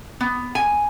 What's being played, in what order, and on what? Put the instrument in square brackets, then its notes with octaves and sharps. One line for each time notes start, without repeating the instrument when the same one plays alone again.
[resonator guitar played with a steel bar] B3
G#5